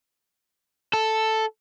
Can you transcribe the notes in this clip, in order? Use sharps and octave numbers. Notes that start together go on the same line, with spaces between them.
A4